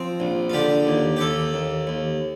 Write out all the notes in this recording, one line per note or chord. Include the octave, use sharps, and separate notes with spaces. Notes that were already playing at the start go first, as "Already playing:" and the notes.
Already playing: F3 C4
A#1
F4
D3 G4
D#2
G4
D#2 A4
D#2
D#2